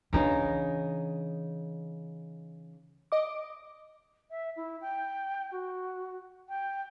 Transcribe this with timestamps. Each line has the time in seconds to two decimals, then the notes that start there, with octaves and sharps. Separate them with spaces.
0.13 C#3 E3 D4 D#4 A#4
3.12 D#5 D6
4.31 E5
4.56 E4
4.81 G5
5.52 F#4
6.49 G5